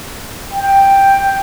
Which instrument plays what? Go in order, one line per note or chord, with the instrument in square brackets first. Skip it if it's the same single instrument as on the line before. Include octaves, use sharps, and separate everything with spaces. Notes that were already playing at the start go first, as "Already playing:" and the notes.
[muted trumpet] G5